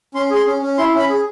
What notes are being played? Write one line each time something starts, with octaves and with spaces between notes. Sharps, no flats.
C#4 C6
G#4 C6
C#4
C#4
E4 C6
C#4 B5
G#4